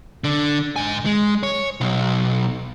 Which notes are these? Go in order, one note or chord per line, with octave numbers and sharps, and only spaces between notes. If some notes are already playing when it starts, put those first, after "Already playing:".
D3
G#2 G#5
G#3
C#5
B1